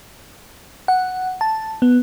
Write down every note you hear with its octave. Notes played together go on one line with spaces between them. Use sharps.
F#5
A5
B3